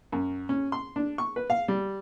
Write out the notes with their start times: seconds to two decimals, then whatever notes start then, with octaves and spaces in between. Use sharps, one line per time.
0.12 F#2
0.49 C#4
0.72 C6
0.96 D4
1.18 C#6
1.36 B4
1.50 F5
1.68 G3